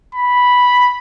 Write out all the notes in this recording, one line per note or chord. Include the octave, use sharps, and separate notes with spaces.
B5